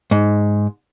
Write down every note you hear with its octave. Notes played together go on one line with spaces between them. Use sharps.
G#2